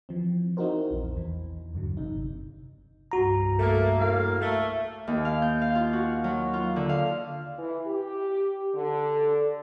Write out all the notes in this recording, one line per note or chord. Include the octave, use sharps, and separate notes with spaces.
E3 F3 C4
C4 D#4 E4 F#4 A#4 C5
A#1 E2
E2 E3
E2 G2 D3 F#3
G1 C3 D#4
C2 G2 F#4 A#5
A3 A#3
A2 A#3 F5
A3
D#2
F5
G6
F5
F4
F#4
F#3
F4
D3
F5
E3
G4
D3